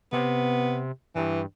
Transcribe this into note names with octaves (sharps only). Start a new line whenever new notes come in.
C3 B3
G2 E3